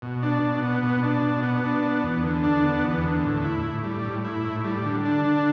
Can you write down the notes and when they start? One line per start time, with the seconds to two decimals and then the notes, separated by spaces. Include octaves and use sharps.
0.02 B2
0.23 D4
0.43 B2
0.62 B3
0.83 B2
1.03 D4
1.23 B2
1.43 B3
1.64 D4
1.83 B3
2.03 E2
2.23 D3
2.44 D4
2.64 B3
2.83 E2
3.03 D3
3.24 A2
3.44 E4
3.64 A2
3.84 G3
4.05 A2
4.25 E4
4.45 A2
4.64 G3
4.85 D3
5.05 D4
5.25 D3